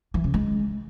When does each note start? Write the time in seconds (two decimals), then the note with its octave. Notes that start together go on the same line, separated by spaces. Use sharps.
0.14 E3
0.24 C#3
0.34 G#3